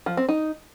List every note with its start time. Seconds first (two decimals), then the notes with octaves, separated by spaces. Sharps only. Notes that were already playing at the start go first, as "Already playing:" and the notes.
0.06 F3
0.17 C4
0.29 D#4